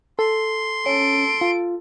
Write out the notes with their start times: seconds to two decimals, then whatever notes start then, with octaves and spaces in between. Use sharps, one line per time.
0.19 A4 C6
0.86 C#4 A4 D7
1.41 F4